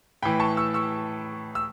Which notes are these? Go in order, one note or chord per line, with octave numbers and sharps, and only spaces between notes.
A2 E3 G5 B5
A5 C#6
C#6 E6
C#6 E6
E6